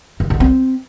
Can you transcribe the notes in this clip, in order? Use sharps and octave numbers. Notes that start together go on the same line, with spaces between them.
D3
D3
C4